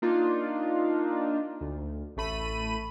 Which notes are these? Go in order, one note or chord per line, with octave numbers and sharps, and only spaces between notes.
A#3 D4 D#4 F4
D2
A1 A3 B5 D#7